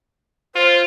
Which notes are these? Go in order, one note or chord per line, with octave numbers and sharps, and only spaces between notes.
F4 C5